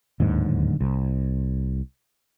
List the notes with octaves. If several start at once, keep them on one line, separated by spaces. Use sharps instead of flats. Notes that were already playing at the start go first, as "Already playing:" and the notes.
D1 D#2 G#2 D3
C2